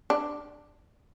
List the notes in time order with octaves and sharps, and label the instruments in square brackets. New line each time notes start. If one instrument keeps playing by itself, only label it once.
[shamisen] D4